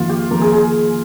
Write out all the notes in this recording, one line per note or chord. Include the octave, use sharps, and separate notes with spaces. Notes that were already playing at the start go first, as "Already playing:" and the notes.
Already playing: F2 D#3 A#3 F4
G4
F2 D#3 A#3 A#4
G#4
G#4